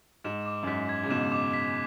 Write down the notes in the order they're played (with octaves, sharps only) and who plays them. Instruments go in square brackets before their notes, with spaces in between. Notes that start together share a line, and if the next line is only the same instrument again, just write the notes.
[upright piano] G#2 [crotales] E7
[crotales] D6
[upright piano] F#2
[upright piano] G#2 [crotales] B6
[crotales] G#6
[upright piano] C#3
[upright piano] G#2 B2 [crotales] E7
[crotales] D6
B6